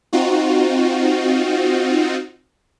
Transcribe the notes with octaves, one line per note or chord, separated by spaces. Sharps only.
C4 D#4 F4 F#4